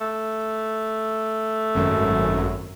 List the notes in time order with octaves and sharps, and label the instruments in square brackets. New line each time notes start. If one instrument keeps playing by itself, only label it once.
[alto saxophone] A3
[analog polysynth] G#1 F#2